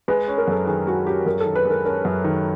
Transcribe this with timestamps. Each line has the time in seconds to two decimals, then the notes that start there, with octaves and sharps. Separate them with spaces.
0.08 G#3 B4
0.28 C#4
0.38 A#4
0.48 F#2 A4
0.67 D#3 G#4
0.87 G#3 F#4
1.06 C#4 G4
1.26 F#2 A#4
1.40 A4
1.46 D#3
1.55 B4
1.65 G#3 A#4
1.85 C#4 A#4
2.05 F#2
2.24 D#3